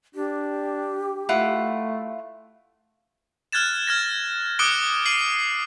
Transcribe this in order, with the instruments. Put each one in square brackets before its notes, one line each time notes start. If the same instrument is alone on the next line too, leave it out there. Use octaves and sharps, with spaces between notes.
[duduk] D4 [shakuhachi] G4
[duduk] A3 [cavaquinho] E4 F4 F#5
[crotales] F6 F#6 G#6 A6 E7
F6 G#6 A#6
D6 D#6 F#6 C#7 D7 G7
C7 D#7 F#7